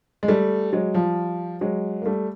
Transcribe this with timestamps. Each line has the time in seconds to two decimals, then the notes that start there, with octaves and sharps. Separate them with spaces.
0.23 G#3
0.28 G3 A3
0.72 F#3 G#3
0.94 F3 G3
1.61 F#3 G#3
2.02 A#3
2.06 G3 A3